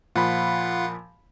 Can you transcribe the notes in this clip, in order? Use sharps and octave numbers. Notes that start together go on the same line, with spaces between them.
A#2 F3 F4 F#5 B5